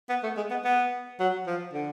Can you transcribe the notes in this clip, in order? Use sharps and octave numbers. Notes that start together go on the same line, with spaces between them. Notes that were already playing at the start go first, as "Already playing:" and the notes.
B3
A3
G#3
B3
B3
F#3
F3
D3